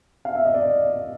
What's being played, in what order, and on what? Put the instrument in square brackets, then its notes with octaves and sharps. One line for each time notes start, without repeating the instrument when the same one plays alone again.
[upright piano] F5
E5
D#5
D5